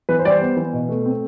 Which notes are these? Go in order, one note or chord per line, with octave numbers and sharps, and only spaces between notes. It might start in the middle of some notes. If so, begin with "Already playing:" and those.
E3 B4
C5
G3 D5
C5
B3
E3
B2
A3
C4